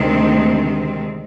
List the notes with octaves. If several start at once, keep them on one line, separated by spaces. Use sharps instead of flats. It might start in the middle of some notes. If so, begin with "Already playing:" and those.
Already playing: D2 C3 D#3 G#3 C4